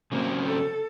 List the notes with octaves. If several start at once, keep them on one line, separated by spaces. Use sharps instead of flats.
C#3 F#3 A#3 C4
A4